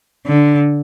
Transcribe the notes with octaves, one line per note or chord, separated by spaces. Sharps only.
D3